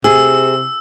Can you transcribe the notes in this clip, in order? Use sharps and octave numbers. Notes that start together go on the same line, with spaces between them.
C3 G#4 E6